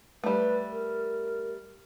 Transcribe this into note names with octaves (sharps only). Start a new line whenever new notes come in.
G3 A3 B4
A#4